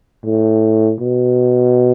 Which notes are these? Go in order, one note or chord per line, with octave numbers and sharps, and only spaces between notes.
A2
B2